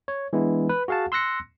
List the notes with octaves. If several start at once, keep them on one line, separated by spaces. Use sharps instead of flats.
C#5
E3 G#3 B3 D4 E4
B4
F#4 G#4 F5 F#5 A5
C6 E6 F#6 A#6 C#7